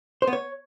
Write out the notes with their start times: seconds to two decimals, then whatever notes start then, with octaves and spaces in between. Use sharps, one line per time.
0.22 C5
0.27 B3
0.33 C#5